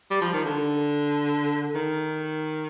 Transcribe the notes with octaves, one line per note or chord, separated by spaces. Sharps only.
G3
F3
D#3
D3
D#3